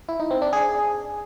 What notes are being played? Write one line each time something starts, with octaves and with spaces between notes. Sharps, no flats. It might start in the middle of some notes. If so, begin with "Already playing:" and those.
E4
D#4
C4
D4
G#4